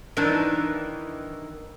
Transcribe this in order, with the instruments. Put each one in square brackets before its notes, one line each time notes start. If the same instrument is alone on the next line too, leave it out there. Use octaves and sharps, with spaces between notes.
[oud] D#3 E3 D4